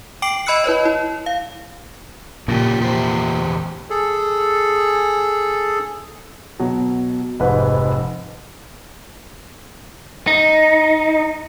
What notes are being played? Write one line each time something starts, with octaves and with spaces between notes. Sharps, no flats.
G5 D6 C7 D7 F#7
D#5 B5 E6 F#6 C#7
E4 B4 C#5 D#5
E4
F5
A#2 C#3 F3 G4
E2 G4 C5
G#4 A4
B2 F#3
F1 G#2 B4
D#4